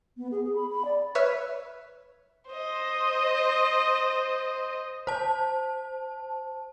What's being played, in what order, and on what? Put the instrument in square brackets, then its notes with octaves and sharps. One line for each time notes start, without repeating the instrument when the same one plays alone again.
[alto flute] B3
G#4
G#4
B5
B5
D5
[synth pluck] B4 C#5 E5 F6
[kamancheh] C5 D#5
[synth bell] C5 A5